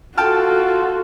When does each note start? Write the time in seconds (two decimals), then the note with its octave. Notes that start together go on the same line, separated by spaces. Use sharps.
0.18 F4 F#4 A4 G5 A5 F6